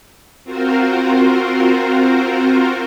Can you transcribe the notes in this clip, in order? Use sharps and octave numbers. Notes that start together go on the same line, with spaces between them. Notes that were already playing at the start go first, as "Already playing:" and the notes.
C4 F4 F#4 A#4 C5